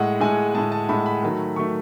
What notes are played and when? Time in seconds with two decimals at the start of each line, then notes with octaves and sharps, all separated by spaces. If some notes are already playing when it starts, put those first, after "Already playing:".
Already playing: A2 G#3 F#5
0.20 A2 G#3 G#5
0.54 A2 G#3 A5
0.72 A5
0.89 A2 G#3 B5
1.06 B5
1.23 D#3 F#3 A3
1.56 D#3 F#3 A3 C#6